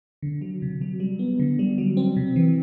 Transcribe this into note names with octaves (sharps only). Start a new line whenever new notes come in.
D3
F#3
C3
F#3
G3
B3
D3
G3
F#3
C4
C3
E3